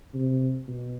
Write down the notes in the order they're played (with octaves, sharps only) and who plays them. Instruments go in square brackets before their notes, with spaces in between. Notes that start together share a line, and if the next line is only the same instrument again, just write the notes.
[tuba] C3
B2